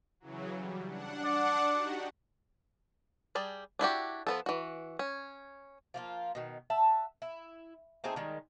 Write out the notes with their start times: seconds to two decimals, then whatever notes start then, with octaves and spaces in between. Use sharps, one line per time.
0.20 C#3 E3 F#3
0.57 G3
0.87 D4 F#5
1.24 D5
1.71 D#4 F#4 G4
3.35 G3 G#4 A5
3.79 D4 E4 F#4 G4
4.27 F3 B3 A4
4.46 E3 F#4
4.99 C#4
5.94 F3 A#3 F4
6.35 B2 D#3
6.70 E5 F#5 A5
7.22 E4
8.04 A3 C4 D#4 G#4
8.16 D#3 G3 G#3